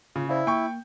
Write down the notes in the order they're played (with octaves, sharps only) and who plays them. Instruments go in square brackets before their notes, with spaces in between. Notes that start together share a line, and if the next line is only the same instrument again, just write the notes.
[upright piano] C#3 [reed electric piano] F4
[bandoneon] E4 [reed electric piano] C5 D5 F5
[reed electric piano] A#3 [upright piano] G5 C#6